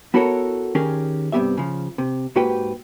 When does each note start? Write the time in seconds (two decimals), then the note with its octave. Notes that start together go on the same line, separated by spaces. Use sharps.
0.14 B3 E4 F#4 A4 A#4 C#5
0.75 D#3 C#4 G4 G#4 A#4
1.32 G2 C3 F#3 B3 G4 E5
1.57 C#3 F3
1.98 C3
2.36 G#2 A#3 F#4 G4 B4 G5